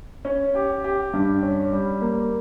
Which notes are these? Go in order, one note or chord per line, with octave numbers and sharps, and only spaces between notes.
C#4
G4
G4
G2
C#4
G3
A#3